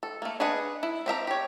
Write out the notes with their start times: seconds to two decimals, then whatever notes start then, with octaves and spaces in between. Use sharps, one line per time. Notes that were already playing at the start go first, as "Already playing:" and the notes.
0.03 A4
0.22 A3 A#3
0.40 D4 G#4 B4 D#5 F#5
0.83 E4
1.06 C4 G4 E5 A#5
1.27 G4 C#5